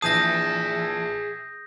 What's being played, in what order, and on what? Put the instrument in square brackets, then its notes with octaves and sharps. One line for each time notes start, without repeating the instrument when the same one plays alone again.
[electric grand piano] A#1 E3 A5 [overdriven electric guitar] G#4 E5 [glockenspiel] D#6 G6 A#6